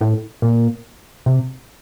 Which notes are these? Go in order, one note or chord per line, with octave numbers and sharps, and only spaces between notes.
A2
A#2
C3